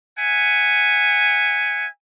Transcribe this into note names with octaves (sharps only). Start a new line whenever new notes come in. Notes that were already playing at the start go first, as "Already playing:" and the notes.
E5 F#5 G#5